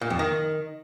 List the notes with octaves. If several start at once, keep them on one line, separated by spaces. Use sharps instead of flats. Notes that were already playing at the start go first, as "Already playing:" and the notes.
A#2
F2
D#3